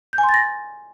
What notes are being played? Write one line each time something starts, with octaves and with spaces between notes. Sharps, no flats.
G6
G#5
C6
A6
A#6